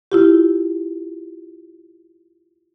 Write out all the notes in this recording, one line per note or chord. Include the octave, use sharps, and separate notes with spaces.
E4 F4 G4